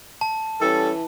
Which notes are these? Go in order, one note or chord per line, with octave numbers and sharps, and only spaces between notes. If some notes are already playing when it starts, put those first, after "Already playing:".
A5
E3 G3 C#4 A4